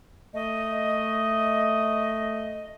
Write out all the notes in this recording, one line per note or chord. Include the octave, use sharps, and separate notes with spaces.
A3 D#5